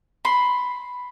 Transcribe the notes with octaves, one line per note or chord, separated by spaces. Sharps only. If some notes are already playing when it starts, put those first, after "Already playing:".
B5 C6